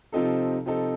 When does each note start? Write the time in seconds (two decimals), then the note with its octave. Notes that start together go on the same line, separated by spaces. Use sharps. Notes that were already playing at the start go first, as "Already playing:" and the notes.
0.12 C3 F3 C4 D#4 A4
0.66 C3 F3 C4 D#4 A4